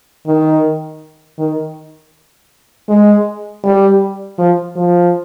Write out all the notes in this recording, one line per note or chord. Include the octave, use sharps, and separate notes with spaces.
D#3
D#3
G#3
G3
F3
F3